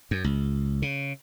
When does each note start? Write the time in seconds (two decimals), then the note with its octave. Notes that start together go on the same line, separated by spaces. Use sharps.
0.11 F#2
0.24 C#2
0.82 C#3